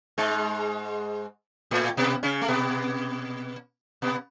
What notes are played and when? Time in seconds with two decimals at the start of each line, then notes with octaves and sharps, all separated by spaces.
0.18 G#2 G#3
1.71 A2 A3
1.97 B2 B3
2.23 C#3 C#4
2.41 A3
2.48 B2 B3
4.02 B2 B3